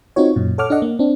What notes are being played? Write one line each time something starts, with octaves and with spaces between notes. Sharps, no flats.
C4 D#4 F4 F#4 C#5
F#2 A#2
A4 C#5 F#5 D6 F6
D4 A4 D#5 F#5
A#3
C4 D4